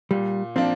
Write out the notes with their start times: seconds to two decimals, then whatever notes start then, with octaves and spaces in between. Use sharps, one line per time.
0.11 A#2 G3
0.56 F3 A#3 C4 D4